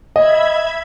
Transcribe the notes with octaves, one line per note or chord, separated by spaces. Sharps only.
D#5 E5 B5 G#6